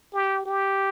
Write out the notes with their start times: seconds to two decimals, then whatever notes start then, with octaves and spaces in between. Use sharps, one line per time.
0.13 G4
0.46 G4